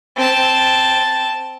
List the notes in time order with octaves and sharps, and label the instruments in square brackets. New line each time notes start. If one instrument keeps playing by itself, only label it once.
[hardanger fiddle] C4 A5